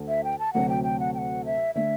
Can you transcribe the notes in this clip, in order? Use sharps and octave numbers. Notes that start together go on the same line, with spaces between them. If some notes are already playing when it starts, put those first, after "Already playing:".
Already playing: D2 D3 A3
E5
G5
A5
D2 C3 F#3 A3 F#5
G5
G5
F#5
G5
F#5
E5
D3 A3 E5